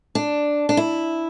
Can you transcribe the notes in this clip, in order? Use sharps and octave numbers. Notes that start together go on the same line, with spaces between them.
D4
D4
E4